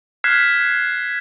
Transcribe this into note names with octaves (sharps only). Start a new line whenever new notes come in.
F6 F#6 G#6 B6 C7 E7